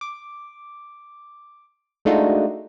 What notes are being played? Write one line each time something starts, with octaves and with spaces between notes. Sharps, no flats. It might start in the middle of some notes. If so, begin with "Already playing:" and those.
D6
G#3 A3 D4 D#4 F4 F#4